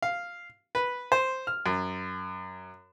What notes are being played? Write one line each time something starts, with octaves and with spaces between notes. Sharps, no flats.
F5
B4
C5
F6
F#2